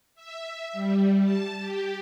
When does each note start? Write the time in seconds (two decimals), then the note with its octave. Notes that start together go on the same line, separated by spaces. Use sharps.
0.15 E5
0.73 G3
1.23 A5
1.58 G4